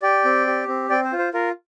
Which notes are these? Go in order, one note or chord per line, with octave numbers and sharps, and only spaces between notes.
G4 D5 G5
C4
G4
C4
C4 D5 G5
C5
F4
C5
F4 A#4